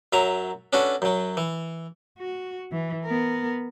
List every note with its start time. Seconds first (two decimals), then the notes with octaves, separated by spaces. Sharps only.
0.13 F#2 F#3 E5 A#5
0.73 C#4 D4 F#4 A4 B4
1.02 F#2 F#3
1.37 E3
2.19 F#4
2.72 E3
3.05 B3 A#4